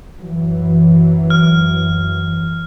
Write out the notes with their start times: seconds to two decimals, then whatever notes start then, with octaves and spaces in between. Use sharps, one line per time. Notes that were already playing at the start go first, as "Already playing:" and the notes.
0.19 F#2 E3 F#3
1.30 F6